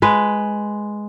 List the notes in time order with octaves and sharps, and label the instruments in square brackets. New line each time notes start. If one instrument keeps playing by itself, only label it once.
[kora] G#3 B4